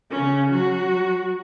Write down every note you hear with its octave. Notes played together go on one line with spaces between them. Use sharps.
C#3 C#4
F#3 F#4